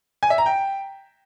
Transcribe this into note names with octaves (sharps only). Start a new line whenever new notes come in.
G#5
E5
A#5
G5